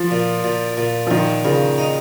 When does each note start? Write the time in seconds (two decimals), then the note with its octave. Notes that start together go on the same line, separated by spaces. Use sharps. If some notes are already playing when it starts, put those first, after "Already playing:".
Already playing: F3
0.11 A#2
0.44 A#2
0.77 A#2
1.07 F3
1.11 A#2 D#3
1.44 A#2 C#3
1.78 D#4